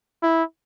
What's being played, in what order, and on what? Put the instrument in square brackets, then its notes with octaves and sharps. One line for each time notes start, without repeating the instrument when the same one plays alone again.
[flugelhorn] E4